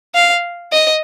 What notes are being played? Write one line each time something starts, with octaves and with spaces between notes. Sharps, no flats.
F5
D#5